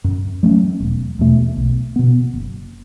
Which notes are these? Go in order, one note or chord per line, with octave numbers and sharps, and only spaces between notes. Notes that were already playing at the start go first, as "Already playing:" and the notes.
F#2
F#3 A3 C#4
E1
E2 B2 A3
B1
B2 B3
F#1